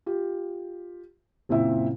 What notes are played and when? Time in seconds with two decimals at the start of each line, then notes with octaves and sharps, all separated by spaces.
0.06 F4 G4
1.49 F#1 A#2 C4 E4 E5